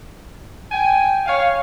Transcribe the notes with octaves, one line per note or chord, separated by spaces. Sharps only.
G5 G#5
C#5 F5